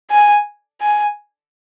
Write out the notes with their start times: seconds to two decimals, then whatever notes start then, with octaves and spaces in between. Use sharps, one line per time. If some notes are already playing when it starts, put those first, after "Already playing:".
0.11 G#5
0.81 G#5